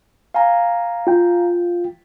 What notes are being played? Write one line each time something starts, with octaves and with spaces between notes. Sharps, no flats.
F5 G#5 A#5
F4 G5